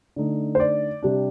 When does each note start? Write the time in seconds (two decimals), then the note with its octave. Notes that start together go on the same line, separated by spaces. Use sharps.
0.16 D3 A3 D#4
0.55 C5
0.60 D5
1.03 C3 G3 D4